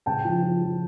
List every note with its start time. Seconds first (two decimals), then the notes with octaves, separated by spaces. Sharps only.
0.06 C#3 G5 A5
0.25 F3
0.43 F3
0.61 F3